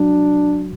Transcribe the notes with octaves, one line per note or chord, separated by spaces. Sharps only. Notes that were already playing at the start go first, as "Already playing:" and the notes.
Already playing: F#3 D4 F#4